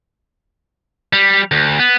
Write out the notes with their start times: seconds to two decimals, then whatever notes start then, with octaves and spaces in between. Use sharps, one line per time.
1.13 G3
1.51 D2
1.79 B3